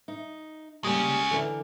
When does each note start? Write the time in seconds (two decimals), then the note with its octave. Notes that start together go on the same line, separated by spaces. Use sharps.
0.08 D#4
0.84 G3 G#3 A#3 C#4
1.31 D3 E3 A#4